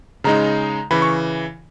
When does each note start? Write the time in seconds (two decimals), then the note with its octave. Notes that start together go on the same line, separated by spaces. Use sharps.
0.24 C#3 G#3 D#4 A#5
0.91 C#3 E3 B5
1.02 C#6